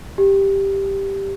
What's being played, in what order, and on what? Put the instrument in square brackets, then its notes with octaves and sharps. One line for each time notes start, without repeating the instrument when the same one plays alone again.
[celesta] G4